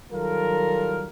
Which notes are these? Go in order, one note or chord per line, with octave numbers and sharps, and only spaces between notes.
D#3 F#3 G3 F4 A4 A#4